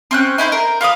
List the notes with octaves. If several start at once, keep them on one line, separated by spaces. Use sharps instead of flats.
C4 C#4 F#6
D#4 E4 G#4 C5
A#4
F4 B4 F5 D#6